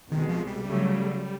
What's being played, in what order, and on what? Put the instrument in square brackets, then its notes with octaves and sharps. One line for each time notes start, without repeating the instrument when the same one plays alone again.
[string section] C2 B2 G#3 [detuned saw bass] D#3
[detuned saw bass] F3
G3
[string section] C#3 F#3 A3